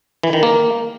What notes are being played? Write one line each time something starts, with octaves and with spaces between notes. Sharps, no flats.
E3
D#3
A#3